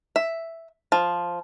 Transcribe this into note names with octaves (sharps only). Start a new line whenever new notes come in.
E5
F3